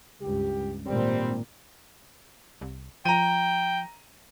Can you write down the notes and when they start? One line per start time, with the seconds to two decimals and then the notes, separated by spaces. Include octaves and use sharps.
0.21 C#2 G2 G4
0.86 G#1 A#2 G3 C4
2.61 C2
3.05 F3 G5 A#5 D#7